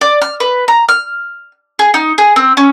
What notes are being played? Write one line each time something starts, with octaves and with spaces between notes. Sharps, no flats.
D5
F6
B4
A#5
F6
G#4
D#4
G#4
C4
C#4